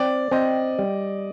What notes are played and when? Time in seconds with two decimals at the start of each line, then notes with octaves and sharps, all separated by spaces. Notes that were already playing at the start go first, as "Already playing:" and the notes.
Already playing: C4 D5
0.31 C4 D#5
0.79 G3